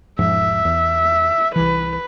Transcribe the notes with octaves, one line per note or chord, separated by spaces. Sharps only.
E1 G#2 F3 E5
E2
C2 E3 B4